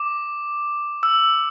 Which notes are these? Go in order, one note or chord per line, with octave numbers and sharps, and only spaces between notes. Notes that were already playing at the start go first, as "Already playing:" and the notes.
Already playing: D6
E6